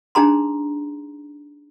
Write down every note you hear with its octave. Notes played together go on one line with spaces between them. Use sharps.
D4 D#4 G#4 A#5 C6